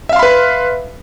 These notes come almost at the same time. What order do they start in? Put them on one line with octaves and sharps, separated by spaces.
E5 F5 C6 B5 B4